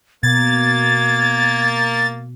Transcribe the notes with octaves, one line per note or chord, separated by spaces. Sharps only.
B2 A#3 G#6 A6